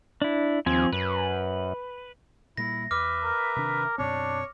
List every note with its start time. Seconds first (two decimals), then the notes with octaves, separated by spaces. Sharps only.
0.22 D4 E4
0.66 D#2 F3 C4 G#5
0.92 F#2 B4
2.57 A#2 G3 A#3 E4 A#6
2.91 E2 B4 E5 D6 F6
3.24 A#4
3.56 C3 D#3 D4
3.98 F#2 B2 C4 D4 C#5